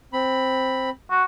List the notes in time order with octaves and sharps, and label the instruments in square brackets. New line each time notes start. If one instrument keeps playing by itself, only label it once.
[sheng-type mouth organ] C4 B5
[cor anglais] F#4